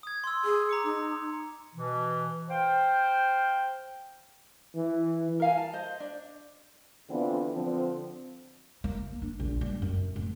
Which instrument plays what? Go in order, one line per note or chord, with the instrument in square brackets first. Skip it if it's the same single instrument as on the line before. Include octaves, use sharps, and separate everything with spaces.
[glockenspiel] D#6 G#6
C6 E6
[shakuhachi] G#4
[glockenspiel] A#5 D6 C#7
[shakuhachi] D#4
[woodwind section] B2 E3
C5 F5 G5
[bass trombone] E3
[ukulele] A#4 F5 G#5
A5
C5 D#5
D4
[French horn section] D3 E3 B3 C4 D4 F4
D3 F3 C4
[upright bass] A#3
D4
A#1
G3
F#2
D1